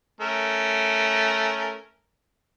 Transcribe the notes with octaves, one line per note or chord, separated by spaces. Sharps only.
A3 C#4 A#4